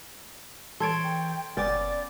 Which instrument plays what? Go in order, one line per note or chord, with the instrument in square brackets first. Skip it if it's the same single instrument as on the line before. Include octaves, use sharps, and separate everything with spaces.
[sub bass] E3 [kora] A4 C#5 [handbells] C6 G#6 D7
[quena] G5
[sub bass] F#1 [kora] B3 C#4 G5 [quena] D5 [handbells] D6 A6